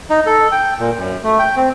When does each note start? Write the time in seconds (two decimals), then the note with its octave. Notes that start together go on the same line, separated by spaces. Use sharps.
0.10 D#4
0.26 A4
0.52 G5
0.79 A#2
0.98 F#2
1.24 A3
1.39 G5
1.56 C4